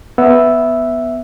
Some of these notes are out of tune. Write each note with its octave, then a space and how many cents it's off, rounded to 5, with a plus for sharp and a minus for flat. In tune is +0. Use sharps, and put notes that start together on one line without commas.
B3 +0 E5 +0 E6 +0